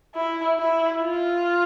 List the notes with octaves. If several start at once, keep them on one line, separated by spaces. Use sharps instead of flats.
E4
E4
F4